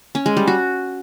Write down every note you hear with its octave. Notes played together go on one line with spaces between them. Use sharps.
C#4
G#3
G3
F#4